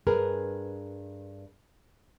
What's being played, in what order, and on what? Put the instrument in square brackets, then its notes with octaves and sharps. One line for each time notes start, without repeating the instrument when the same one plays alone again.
[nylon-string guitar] G2 G#4 A#4 B4